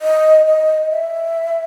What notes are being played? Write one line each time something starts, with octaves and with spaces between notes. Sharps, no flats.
D#5
D#5
E5